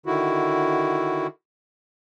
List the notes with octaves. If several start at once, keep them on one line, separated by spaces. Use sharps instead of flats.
D3 D#3 E4 F#4